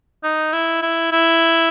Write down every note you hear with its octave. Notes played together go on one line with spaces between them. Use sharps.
D#4
E4
E4
E4